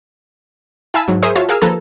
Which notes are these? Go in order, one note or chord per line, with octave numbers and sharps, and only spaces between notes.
E4 F5 G#5 A5 B5 E6
G#2 F#3
G#4 A#4 C5 C#5 E5 D#6
F4 F#4 C#5 E5 F5 A5
G#4 A#4 F5 G#5 E6 F6
D#2 F3 A4 B4 A#5 G#6